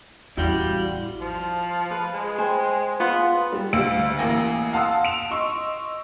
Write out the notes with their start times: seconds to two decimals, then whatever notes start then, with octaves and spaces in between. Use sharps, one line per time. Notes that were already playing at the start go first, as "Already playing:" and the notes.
0.37 A1 E2 G3 E4 F#4 F5
1.21 F3
1.91 B4
2.14 G#3
2.39 C5 G5 G#5
3.00 B3 F4 C6
3.52 G3
3.73 D2 F5 E6 D7
4.19 A1 A#3 G#5 A#6
4.73 F5 F#5 A5 C6 D#6 E6
5.05 D7 E7 F7
5.31 D#5 C6 C#6 E6